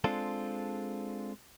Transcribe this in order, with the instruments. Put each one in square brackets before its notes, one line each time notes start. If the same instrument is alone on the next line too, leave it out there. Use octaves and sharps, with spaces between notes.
[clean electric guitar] G#3 C4 D4 F4 G#4 A4